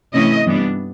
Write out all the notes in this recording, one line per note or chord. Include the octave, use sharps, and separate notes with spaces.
C3 E3 A3 C#4 E4 D#5
G2 E3 G3 B3 D4